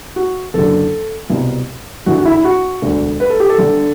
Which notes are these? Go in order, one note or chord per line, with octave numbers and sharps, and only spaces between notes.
F#4
F#1 F#2 D3 A4
C2 B2
G1 G2 E3 F#4
F#4
E4
E4
F#4
E1 D2 D3
B4
A4
G4
A4
G1 G2 D3